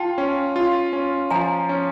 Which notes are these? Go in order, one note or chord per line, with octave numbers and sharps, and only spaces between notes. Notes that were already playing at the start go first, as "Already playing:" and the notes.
Already playing: F4 G5 A5
C#4
F4
C#4
F3 G#5 A#5
C#4